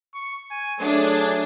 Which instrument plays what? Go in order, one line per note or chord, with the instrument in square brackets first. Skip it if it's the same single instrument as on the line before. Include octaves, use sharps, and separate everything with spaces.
[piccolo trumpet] C#6
G#5
[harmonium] F#3 A3 [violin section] D4 [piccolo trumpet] G#4